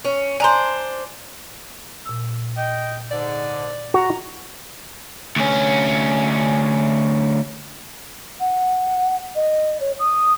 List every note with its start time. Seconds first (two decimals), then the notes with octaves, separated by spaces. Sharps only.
0.05 C#4
0.40 D4 C5 G#5 A#5 C6
2.05 A#2 E6
2.56 D#5 G5
3.11 G#2 D3 D5
3.94 F#4 A#5
5.36 D2 C#4
8.40 F#5
9.35 D#5
9.80 C#5
9.99 D#6